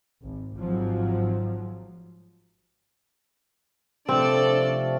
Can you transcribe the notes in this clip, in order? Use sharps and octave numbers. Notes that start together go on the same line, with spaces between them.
G#1
G#1 G#2 F3 F#3
C3 F3 A3 C4 D4 A4 D5